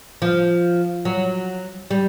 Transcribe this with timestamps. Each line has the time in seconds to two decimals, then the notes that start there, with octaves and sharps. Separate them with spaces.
0.22 F3
1.05 F#3
1.91 G3